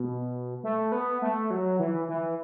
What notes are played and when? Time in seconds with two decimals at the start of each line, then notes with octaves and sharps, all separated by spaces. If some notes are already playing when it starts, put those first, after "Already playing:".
Already playing: B2
0.64 A3
0.92 B3
1.22 A3
1.50 F#3
1.79 E3
2.08 E3